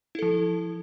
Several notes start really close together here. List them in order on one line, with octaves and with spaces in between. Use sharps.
E4 A4 F3